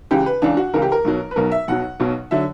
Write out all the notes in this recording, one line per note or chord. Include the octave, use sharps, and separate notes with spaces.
C#2 C#3 E3 G4
B4
C#2 C#3 E3 D4
F#4
C#2 C#3 E3 A#4
G4
A#4
B1 B2 F#3
B4
B1 B2 F#3 A#4
E5
B1 B2 F#3 F#5
B1 B2 F#3
D3 F#3 E5